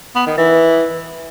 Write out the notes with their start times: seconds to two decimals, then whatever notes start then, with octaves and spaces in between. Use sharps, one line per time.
0.16 B3
0.27 D#3
0.38 E3